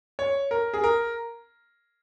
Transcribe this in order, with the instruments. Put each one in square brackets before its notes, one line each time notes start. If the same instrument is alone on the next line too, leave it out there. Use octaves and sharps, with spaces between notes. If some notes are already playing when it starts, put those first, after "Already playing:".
[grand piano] C#5
A#4
G#4
A#4